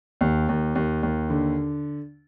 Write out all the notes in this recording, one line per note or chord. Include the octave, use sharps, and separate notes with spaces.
D#2
D#2
D#2
D#2
D3